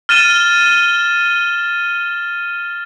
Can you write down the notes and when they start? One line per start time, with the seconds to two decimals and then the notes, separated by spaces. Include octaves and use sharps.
0.09 F6 A6 D#7 E7 G7